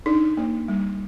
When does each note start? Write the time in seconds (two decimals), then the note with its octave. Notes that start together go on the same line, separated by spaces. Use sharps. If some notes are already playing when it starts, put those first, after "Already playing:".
0.06 D4 D#4
0.37 A#3
0.68 G3